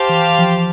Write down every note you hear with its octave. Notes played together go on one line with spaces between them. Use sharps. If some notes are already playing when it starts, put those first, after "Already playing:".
Already playing: G4 C5 F5 A5
E3
F3